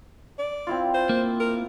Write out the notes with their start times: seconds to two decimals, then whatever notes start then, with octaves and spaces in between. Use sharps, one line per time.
0.39 D5
0.67 C4 E4 F4
0.94 C5
1.09 A#3
1.40 A#4